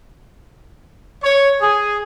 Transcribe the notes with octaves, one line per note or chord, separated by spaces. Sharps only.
C#5
G#4